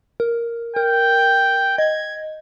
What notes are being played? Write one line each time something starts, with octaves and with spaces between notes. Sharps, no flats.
A#4
A#4 G5
D#5 G#6